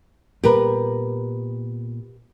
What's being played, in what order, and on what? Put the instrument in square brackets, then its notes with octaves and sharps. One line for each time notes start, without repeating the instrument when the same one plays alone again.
[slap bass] A#2 G3 B3 [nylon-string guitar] G4 A#4 B4